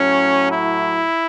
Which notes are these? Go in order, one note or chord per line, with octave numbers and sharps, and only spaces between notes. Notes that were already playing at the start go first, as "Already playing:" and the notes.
Already playing: A2 F#3 C#4
E4